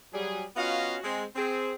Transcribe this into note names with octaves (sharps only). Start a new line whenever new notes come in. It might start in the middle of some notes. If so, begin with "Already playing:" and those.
F#3 G3 G#4
B3 C#4 F4 F#4 D#5 F5
G#3 C4
C4 G#4